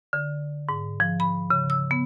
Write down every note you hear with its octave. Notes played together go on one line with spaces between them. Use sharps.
D3
G#2
F3
B5
C#3
E6
B3